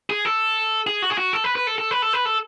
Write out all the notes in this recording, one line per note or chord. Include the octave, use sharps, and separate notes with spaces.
G#4
A4
G#4
F#4
G#4
F#4
A4
B4
B4
A4
A4
B4
A4
B4
A4